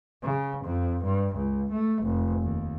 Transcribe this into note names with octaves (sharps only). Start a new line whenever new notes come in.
C#3
F2
G2
C#2
A3
F1
D#2